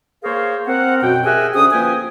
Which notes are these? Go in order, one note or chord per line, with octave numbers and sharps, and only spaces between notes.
A#3 G#4 A#4 C5 C#5 F5
C4 A#4 F#5
F#2 B2 C4 G5
G4 G#4 A#4 E5 F#5 G#5
D3 C#4 C5 D#6
F3 A#3 B4 G5 G#5